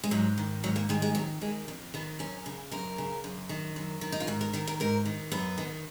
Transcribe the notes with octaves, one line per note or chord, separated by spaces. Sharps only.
G#3
G#2 F#3
D#3
G#2 F#3
A#3
D#3 G#3
G#3
F2 F#3
D#3 G#3
F2
D#3 B3
F#2 C#4
C#3
F#2 A#4
C#3
F#2
D#3
F#2
D#3
D#4
F4
G#2 F#4
A#4
D#3 A#4
A#4
G#2 A#4
D#3
F#2 B3
D#3